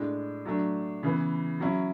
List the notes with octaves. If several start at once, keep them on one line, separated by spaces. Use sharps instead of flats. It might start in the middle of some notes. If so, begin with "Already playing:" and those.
Already playing: A2 G#3 D4
F#3 A3 D4
C#3 E3 B3
F#3 C#4 E4